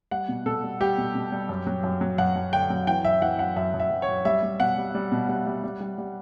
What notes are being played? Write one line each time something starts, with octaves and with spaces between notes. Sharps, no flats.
G3 F#5
B2
B2 A4
G3
G3 G4
B2
B2
G3
F#2
F#3
F#2
F#3
F#2 F#5
F#2
D3 G5
F#3
E3 G5
F#2 E5
E3 F#5
F#2 F#5
F#2 E5
F#2
E5
F#2
C#5
F#2
G3 E5
G3
B2 F#5
G3
G3
B2
G3
G3
G3
G3
G3